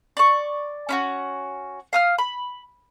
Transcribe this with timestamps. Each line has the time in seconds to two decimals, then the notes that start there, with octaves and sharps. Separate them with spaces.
0.17 D5 C#6
0.89 C#4 E4 F#4
1.93 F5 D#6 F6
2.18 B5